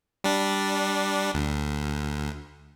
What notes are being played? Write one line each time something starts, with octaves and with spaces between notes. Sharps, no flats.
G3 D4
D2